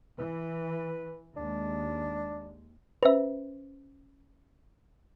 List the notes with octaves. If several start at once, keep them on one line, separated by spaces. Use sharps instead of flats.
E3 B4
D#2 G#3 D4
C#4 B4 C5 E5